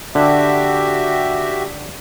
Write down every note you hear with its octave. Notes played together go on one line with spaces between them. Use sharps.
D3 F#4 G4 E5